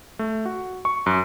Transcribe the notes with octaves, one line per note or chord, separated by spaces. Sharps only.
A3
F#4
C#6
F#2